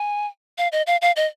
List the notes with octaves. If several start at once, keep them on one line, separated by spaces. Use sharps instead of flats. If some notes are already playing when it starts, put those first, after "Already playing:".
Already playing: G#5
F5
D#5
F5
F5
D#5